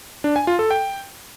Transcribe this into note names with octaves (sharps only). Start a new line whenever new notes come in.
D4
G#5
F4
A4
G5